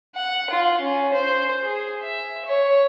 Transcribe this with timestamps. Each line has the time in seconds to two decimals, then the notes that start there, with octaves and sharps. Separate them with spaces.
0.15 F#5
0.50 F4
0.81 C#4
1.14 C5
1.63 G#4
2.03 E5
2.45 C#5